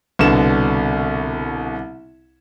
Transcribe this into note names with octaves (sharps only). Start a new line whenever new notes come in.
C2 B2 D3 E7